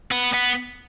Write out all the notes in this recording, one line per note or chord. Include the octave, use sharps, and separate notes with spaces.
B3
B3